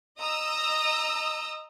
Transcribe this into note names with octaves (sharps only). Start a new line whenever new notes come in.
D#5 A#5 D#6 E6